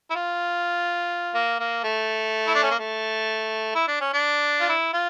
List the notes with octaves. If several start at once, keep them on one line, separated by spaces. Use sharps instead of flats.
E4
F4
A#3
A#3
A3
E4
D4
C#4
A#3
A3
E4
D4
C#4
D4
F4
E4
F4